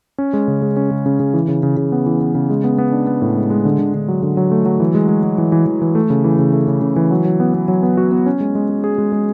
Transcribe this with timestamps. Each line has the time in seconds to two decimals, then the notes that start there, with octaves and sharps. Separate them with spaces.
0.18 C#4
0.33 G#3
0.48 C#3
0.62 G#3
0.77 C#4
0.91 C#3
1.06 C#3
1.20 C#3
1.34 E3
1.48 C#3
1.63 C#3
1.77 C#3
1.92 B3
2.06 E3
2.21 B3
2.35 C#3
2.50 G#3
2.64 B3
2.78 B3
2.92 D4
3.07 B3
3.22 A2
3.36 G#3
3.50 G#3
3.65 D3
3.79 D3
3.94 D3
4.08 F#3
4.23 D3
4.37 F#3
4.51 A3
4.66 F#3
4.80 E3
4.95 G#3
5.09 G#3
5.23 G#3
5.38 E3
5.52 E3
5.66 E3
5.82 E3
5.95 A3
6.10 C#3
6.24 E3
6.39 C#3
6.53 A3
6.67 C#3
6.82 C#3
6.96 E3
7.11 F#3
7.25 F#3
7.40 B3
7.54 B3
7.68 F#3
7.83 B3
7.97 F#4
8.12 B3
8.26 C#4
8.40 G#3
8.55 G#3
8.70 G#4
8.84 G#4
8.98 G#3
9.12 G#3